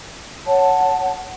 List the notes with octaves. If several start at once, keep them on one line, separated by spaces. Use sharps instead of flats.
C#5 F#5 A5